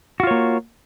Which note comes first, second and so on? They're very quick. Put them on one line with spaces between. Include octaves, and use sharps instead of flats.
F#4 F4 C#5 A#3